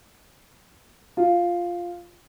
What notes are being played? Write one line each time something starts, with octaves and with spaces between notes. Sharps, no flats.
F4